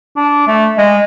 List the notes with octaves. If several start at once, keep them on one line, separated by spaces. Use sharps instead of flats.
D4
A3
G#3